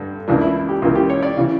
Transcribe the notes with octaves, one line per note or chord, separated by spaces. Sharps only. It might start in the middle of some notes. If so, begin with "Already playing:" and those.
Already playing: G2 D3 A3
C#2 C#3 E3 A#3 D4
E4
G4
C#2 C#3 E3 A#3 F4
G4
C#5
D5
C#3 E3